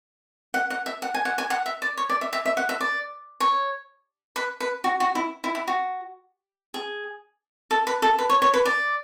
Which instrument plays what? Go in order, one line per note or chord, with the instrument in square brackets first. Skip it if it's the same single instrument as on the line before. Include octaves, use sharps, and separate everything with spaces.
[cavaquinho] F#5
F#5
E5
F#5
G#5
F#5
G#5
F#5
E5
D5
C#5
D5
E5
E5
E5
F#5
E5
D5
C#5
B4
B4
F#4
F#4
E4
E4
E4
F#4
G#4
A4
B4
A4
B4
C#5
C#5
B4
D5